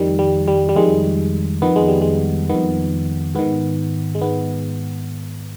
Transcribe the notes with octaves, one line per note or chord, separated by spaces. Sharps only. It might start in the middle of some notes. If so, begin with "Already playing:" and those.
Already playing: F2 D#3 G3
G3
G3
G3
F2 D#3 G#3
F2 D#3 B3
G#3
G3
G#3
F2 D#3 B3
G#2 D#3 B3
G#3
G#2 D#3 B3